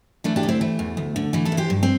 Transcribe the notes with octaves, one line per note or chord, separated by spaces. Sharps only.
E3 A3 D4
D4 G4
D2
C4 E4
E3 A3
E2
D2
D3
E3 A3
E4 A4
E2
G4 C5
G2
C4